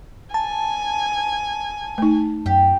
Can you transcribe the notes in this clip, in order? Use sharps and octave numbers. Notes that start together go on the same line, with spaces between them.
G#5 A5
A3 D#4
F#2 G4